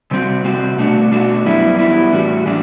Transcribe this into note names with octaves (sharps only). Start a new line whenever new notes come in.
C3 G3 C4 F#4
C3 G3 C4 F#4
B2 A3 D4 F#4
B2 A3 D4 F#4
F#2 E3 G3 B3 E4
F#2 E3 G3 B3 E4
A2 E3 G3 D4 F#4
A2 E3 G3 D4